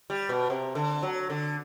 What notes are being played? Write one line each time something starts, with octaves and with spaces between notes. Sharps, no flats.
G3
B2
C3
D3
F#3
D3